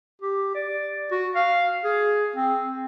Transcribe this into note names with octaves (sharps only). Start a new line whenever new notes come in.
G4
D5
F#4
F5
G#4
C4